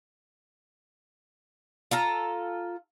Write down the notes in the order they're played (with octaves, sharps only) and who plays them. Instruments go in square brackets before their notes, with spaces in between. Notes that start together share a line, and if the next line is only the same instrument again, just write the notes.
[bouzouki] F4 A4 A#5